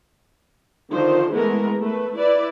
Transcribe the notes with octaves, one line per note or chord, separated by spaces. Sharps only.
D3 D#3 F3 C5
E3 G#3 A3 B3 A#4
A3 B4
E4 B4 D5